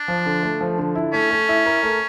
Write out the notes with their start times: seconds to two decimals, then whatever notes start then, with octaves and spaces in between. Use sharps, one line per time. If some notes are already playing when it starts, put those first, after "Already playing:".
Already playing: D4
0.08 F3
0.26 D3
0.43 A3
0.61 F3
0.78 D3
0.95 E4
1.13 A3 C#4
1.31 A3
1.49 E4
1.66 A#4
1.83 A3